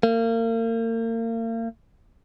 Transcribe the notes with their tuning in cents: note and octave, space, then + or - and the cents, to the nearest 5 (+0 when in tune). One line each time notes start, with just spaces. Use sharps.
A#3 -35